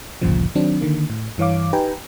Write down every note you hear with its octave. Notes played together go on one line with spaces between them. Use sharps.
G#1 D2 G2 A#2 C#3 F3
D#3 F#3 C4 D4
D3 D#3 A#3
A2
G2 E3 C#5 F5 D6
D#4 G4 B4 G5 G#5 A#5